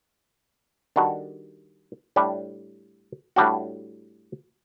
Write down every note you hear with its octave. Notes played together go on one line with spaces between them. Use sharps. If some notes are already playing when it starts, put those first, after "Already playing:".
D#3 G3 D4 F#4 A4
A2 G3 D4
A2 G3 D4 F#4